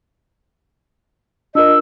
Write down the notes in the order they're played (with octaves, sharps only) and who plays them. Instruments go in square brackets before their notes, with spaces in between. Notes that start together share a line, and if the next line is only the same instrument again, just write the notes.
[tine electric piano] D4 F4 A#4 [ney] D#5 [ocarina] E6